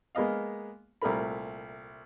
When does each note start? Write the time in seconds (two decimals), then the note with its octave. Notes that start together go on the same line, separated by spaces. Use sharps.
0.15 G#3 A#3 B3 D#5 F5
1.02 C2 A#2 A3 A#4 B5